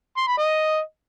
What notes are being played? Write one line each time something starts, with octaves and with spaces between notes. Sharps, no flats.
C6
B5
D#5